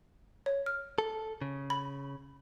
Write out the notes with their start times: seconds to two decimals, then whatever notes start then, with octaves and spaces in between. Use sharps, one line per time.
0.46 C#5
0.66 F6
0.98 A4
1.41 C#3
1.70 B5